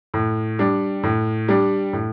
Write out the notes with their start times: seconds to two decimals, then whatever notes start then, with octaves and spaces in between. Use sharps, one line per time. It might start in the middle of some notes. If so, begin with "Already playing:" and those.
0.14 A2
0.59 G3 D4
1.03 A2
1.48 G3 D4
1.93 A2